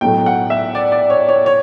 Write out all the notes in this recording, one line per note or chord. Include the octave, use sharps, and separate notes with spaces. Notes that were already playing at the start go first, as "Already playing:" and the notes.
B1 A2 F#3 A3 G5
F#5
E5
D5
D5
C#5
C#5
C#5